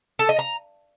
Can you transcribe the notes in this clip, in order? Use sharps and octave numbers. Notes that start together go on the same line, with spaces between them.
A4
D#5
A#5